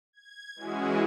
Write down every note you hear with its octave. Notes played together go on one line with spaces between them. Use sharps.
G#6
E3 G#3 C#4 E4 F#4 G#4